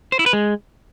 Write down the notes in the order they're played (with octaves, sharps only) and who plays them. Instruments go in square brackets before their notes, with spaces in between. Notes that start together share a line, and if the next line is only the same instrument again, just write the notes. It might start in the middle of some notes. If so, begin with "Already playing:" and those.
[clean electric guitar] C5
E4
B4
G#3